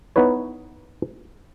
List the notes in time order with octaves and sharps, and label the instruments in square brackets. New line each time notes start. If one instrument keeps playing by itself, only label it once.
[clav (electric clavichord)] B3 D#4 E4 B4 C#5